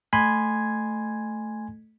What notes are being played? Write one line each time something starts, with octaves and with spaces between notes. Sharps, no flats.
A3 G#5 B5 C6 G#6